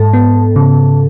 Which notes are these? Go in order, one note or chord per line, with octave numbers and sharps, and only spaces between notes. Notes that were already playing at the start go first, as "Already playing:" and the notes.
Already playing: G#2 A4 A5
B3
C#3